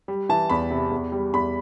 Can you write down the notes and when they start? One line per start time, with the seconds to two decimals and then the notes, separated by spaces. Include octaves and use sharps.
0.08 G3
0.29 E3 A5
0.50 E2 B5
0.71 C3
0.91 E2
1.12 G3
1.33 E2 B5